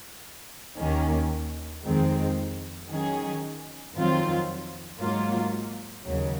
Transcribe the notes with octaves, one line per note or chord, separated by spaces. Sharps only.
D#2 D#3 A#3 C#4
F2 D#3 G#3 C4
D#3 F#3 C#4 G#4
F2 D#3 F#3 C4 F4
G#2 F#3 A#3 F4
D#2 C#3 F#3